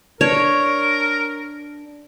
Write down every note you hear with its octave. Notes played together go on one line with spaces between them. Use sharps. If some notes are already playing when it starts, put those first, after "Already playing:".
D4 A#4 C#5